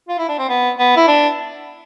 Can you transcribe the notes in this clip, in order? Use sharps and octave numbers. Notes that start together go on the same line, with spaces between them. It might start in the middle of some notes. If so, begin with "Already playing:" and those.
F4
E4
D4
C4
B3
B3
E4
D4